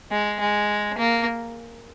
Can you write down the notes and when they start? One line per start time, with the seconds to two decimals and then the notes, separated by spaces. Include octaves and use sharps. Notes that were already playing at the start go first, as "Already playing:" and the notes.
0.11 G#3
0.40 G#3
0.98 A#3